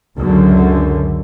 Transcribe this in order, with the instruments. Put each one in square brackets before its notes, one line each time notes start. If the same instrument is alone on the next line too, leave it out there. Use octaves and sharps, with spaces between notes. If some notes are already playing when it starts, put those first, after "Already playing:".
[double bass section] C#2 F#2 D3